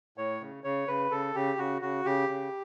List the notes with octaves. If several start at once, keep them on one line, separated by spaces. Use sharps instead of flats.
A2 C#5
C#3
C#3 C#5
C#3 B4
C#3 A4
C#3 G4
C#3 F#4
C#3 F#4
C#3 G4
C#3